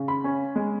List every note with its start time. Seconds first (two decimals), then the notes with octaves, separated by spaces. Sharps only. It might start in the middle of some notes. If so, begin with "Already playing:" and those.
Already playing: C#3
0.08 B5
0.24 C#4
0.56 G#3